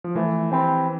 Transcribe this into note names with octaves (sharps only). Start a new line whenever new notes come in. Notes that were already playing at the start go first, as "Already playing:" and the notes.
F3
E3 A3
C4 G4 B4